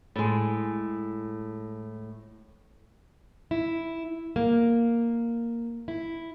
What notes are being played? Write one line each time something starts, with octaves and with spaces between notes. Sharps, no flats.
A2 G#3
E4
A#3
E4